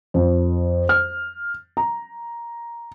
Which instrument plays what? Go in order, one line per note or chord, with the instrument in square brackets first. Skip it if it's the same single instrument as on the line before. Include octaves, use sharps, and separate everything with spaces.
[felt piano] F2
F6
A#5